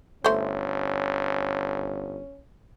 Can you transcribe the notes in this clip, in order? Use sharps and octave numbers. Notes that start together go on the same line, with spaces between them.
G1 A3 C#4 C5